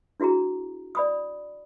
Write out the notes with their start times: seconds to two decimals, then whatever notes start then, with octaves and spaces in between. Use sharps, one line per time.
0.20 D4 E4 F#4 G#4 A#5
0.95 D5 B5 D#6